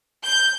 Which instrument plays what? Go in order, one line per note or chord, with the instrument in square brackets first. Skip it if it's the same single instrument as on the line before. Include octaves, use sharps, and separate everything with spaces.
[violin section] G6